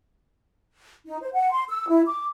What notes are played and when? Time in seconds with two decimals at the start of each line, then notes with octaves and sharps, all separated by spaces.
1.06 D#4
1.22 C5
1.33 F#5
1.51 C6
1.69 E6
1.88 E4
2.06 D6